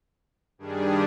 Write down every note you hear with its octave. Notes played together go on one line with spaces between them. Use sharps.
G2 D#3 G3 D4 G#4